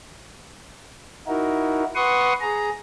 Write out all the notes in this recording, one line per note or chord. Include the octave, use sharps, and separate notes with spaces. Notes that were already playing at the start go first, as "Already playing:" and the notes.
D#4 E4 F#4 A#4
B4 F#5 C6 C#6 D#6
G#4 A#5